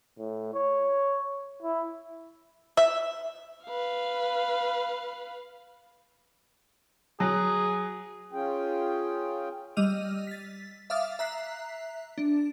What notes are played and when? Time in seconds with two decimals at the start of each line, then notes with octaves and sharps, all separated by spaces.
0.18 A2
0.54 C#5
1.63 E4
2.77 E5
3.65 B4 F5
7.20 F#3 G#4
8.32 C#4 F4 G#4 G5
9.77 G3 D#5 E6 F6 D#7 F7
10.27 A6 B6
10.90 E5 F5 D6 D#6 F6 A6
11.19 E5 A#5 F#6 B6 C7
12.18 D4